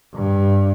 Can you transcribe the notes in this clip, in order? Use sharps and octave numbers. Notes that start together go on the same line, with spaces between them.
G2